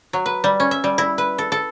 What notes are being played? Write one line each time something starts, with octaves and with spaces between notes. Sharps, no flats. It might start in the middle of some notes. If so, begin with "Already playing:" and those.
F#3
B4
G3
C#4
E5
G3
E4
B4
A4
A4